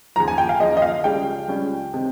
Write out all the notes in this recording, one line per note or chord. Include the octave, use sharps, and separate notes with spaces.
D#2 C#3 F3 A#5
G#5
G5
F5
D#2 C#3 F3 D#5
D#5
F5
C#2 C#3 G3 C#4 G5
C#2 C#3 G3 C#4
C3 D#3